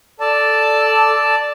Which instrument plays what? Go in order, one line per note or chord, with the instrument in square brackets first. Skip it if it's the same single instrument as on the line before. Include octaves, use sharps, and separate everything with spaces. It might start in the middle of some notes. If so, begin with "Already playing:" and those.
[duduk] A4 [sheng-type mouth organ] D5 A5